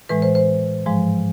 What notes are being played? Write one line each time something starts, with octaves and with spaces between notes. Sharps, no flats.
A2 E3 G#3 B4
C5
C5
G#2 F3 G#3